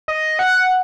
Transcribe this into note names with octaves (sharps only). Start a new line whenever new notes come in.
D#5
F#5